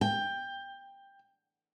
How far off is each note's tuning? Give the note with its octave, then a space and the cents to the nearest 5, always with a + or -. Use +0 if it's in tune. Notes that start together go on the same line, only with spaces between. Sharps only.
G5 +15